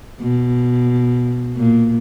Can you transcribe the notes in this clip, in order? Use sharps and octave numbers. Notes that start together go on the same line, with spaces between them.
B2
A#2